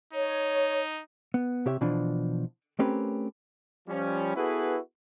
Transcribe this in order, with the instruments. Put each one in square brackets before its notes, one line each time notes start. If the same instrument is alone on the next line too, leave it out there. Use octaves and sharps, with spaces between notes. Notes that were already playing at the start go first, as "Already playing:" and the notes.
[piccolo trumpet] D#4 [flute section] C#5
[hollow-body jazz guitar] B3
C3 G4 C#5 E5
B2 E3 F3 D4
A3 C4 C#4 G4 A#4 B4
[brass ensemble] F3 G3 C#4
B3 E4 F#4 G#4 A4 B4